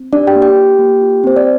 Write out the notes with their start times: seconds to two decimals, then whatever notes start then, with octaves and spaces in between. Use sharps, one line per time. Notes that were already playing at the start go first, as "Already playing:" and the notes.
Already playing: C4
0.12 D4 G4 D5
0.27 G4 G5
0.35 A#3
0.42 G4 G5
0.57 F4
0.79 A#3
1.02 F4
1.24 C4 C5
1.36 D5